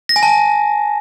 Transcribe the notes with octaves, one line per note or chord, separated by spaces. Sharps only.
A#6
G#5
A5